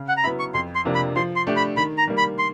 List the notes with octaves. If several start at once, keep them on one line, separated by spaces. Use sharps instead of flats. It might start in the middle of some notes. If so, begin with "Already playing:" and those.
Already playing: C#3
F#5
A#5
F#3 B3 E4 B5
C#6
F2 C6
C6
C3 F3 A#3 D4
B5
F3 C6
C6
A3 D4 G4
B5
D#3 B5
A#5
G3 A#3
B5
C6